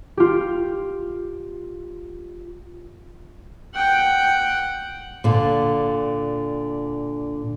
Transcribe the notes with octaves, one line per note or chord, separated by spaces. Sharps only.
F4 G4
F#5 G5
A#2 D3